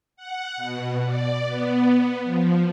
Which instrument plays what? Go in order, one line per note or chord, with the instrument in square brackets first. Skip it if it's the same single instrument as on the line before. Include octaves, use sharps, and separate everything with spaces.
[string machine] F#5
B2
D5
B3
F3